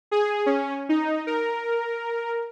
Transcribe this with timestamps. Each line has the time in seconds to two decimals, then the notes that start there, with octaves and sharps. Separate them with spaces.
0.11 G#4
0.46 C#4
0.89 D#4
1.27 A#4